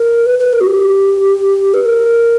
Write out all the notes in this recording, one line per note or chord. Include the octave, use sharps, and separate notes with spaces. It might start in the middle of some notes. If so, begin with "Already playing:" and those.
Already playing: A#4
B4
B4
A#4
F#4
G4
B4
A#4